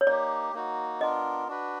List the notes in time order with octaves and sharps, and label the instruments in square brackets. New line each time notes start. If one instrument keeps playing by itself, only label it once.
[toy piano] C#5
[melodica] A#3 D#4 G4 [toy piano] D5
[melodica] A#3 D#4 F#4
[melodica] B3 D4 F4 A#4 [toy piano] D#5
[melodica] D4 F#4 B4